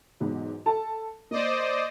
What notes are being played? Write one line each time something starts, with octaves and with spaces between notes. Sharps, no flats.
B1 E2 G#2
A4 A5
A#3 C5 D5 D#5